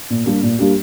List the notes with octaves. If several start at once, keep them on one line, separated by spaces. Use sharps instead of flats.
A#2
G3 A#3 D4 G4
A#2
G3 A#3 D4 G4